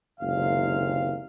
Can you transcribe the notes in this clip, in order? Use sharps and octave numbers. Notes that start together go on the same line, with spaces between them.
F#1 C#2 C3 D#3 F5